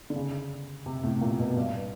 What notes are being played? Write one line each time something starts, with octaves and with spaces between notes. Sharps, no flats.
D3
C#3
C3
A2
A#2
B2
G2